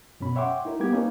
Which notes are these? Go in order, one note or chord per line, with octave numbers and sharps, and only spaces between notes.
F#2 B2 C#4 B5
C#5 E5 F#5 G5 C6 D6
D#4 E4 A#4
G3 A#3 B3 G4 D6 G#6
A#3 C4 C#4 D#4 A#4 B4